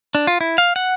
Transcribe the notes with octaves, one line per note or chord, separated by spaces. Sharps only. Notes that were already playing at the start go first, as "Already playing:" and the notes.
D4
F4
E4
F5
F#5